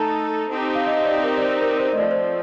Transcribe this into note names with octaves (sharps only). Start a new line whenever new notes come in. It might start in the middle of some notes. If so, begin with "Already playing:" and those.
Already playing: A3 D#4 A4 A5 A#5
C4 D#4 G4
F5
D#5
D5
A#4
D5
C5
A#4
C5
D#5
F3 A3 C4 D5
C5